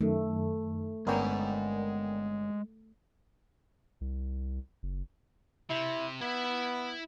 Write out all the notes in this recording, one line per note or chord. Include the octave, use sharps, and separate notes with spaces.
F#2 D#3 A3
G1 G#3 B3 C#4 A#4 D5 G5 A#5
C2
F#1
C3 E4
B3 E4 E5